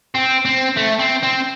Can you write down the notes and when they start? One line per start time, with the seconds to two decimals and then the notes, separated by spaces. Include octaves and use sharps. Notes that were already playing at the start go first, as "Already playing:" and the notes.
0.15 C4
0.45 C4
0.77 A3
0.99 C4
1.23 C4